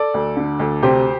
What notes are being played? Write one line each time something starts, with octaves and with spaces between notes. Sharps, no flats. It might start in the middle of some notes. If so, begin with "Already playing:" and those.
Already playing: A4 D5
D2
D3
D2
C3 G4 C5